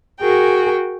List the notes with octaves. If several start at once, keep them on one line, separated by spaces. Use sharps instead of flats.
F#4 G#4 A#4 G5